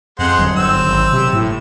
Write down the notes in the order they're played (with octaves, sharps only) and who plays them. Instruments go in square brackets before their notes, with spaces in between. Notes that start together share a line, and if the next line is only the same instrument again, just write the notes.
[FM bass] F2 [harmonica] G#3 C5 F#5
[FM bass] G1 [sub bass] F#3
[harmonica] C4 E6
[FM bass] G#1
C3
A2